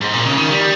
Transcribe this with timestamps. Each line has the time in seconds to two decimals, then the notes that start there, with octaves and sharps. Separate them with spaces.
0.01 G#2
0.13 A#2
0.25 C#3
0.38 D#3
0.51 G3